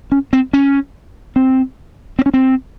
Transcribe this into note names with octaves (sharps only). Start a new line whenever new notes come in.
C#4
C4
C#4
C4
C4
C#4
C4